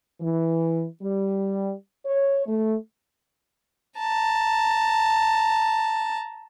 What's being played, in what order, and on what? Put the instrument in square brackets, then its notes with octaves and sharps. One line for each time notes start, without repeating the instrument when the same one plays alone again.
[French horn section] E3
G3
C#5
A3
[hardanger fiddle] A5 A#5